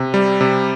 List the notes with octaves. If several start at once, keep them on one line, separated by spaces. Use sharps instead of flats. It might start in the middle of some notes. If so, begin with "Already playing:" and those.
Already playing: C3
G3
C3